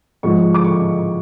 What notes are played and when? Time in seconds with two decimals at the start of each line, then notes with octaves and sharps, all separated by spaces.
0.23 G#2 F3 G#3 C#6
0.54 D6
0.64 C#6